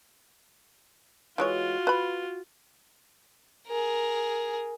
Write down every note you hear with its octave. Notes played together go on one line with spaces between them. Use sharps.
E3 G#3 F4 F#4 C#5
B4 B5
G#4 A#4